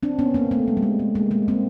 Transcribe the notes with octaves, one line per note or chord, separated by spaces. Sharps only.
C4 D4
B3 C#4
A#3 C4
A3 B3
G#3
G3
G#3
A3
G#3 A#3
G#3 A#3
A#3 C4